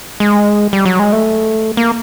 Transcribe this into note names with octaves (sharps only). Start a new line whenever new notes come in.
G#3
G3
F#3
G#3
A3
A#3